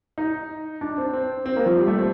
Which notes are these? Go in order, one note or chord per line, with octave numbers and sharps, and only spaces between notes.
D#4
D4
C4
C4
C4
A#3
F3
G3
A3
C4